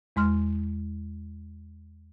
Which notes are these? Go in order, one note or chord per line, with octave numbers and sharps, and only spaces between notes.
E2 G#3 C6 F6